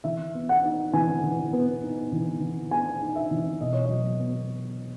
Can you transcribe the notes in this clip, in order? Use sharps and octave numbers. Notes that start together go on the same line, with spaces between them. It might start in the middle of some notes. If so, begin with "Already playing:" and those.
E3 E5
B3
F#5
D#4
E3 G#5
E3
B3
D#4
E3
E3
B3 G#5
D#4
E5
E3
B2 D#5
C#5
F#3 D#5
B3